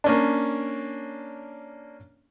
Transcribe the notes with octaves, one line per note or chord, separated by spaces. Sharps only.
A#3 C#4 D4